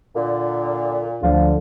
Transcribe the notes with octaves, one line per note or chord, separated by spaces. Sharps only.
A#2 D3
D2 D3 F3 F4